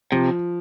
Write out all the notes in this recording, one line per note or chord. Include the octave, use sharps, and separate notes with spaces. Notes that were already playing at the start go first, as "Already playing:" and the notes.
C3 F3